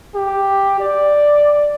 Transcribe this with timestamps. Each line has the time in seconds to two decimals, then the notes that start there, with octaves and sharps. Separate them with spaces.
0.15 G4
0.80 D5